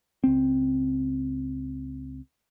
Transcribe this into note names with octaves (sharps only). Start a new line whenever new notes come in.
C#2 C4